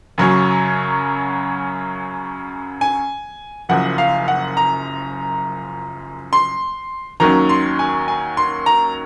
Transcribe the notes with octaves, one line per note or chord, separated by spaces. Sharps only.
F#2 C#3 F#3 C#4
G#5
F#1 F#2 F3 F#5
F5
F#5
A#5
C6
D#2 D#3 F#3 C#4 A#5
C6
G#5
G#5
C6
A#5